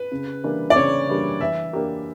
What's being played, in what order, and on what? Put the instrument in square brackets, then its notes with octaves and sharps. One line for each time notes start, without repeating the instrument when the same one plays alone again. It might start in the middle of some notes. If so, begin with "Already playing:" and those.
Already playing: [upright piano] B4
[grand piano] C#3
E3 G3 A#3 D4
[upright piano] D5
[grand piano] C#3 [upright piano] C#5
[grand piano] E3 G3 A#3 D4
[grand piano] E3 [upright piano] E5
[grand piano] A#3 D4 G4 A#4